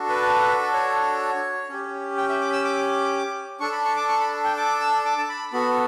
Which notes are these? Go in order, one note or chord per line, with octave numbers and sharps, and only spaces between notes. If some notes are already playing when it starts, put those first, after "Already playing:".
Already playing: D4 F#4 A4
B4
C#5
C#4 G4
G5
E5
D6
E6
D6
D4 A4 C#6
B5
C#6
D6
C#6
B5
G5
D6
E6
D6
A5
B5
B3 F#4 A4 B5